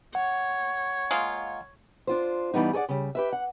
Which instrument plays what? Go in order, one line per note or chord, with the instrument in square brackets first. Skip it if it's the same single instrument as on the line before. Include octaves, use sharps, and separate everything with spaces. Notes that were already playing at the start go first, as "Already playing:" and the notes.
[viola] C#5 [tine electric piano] F#5
[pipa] G#3 A#3 F4
[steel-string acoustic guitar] D4 F4 C5
G2 E3 G3 B3 D#4
G#4 A4 C#5 D5 F#5
C#3 G3
G4 B4 E5
F#5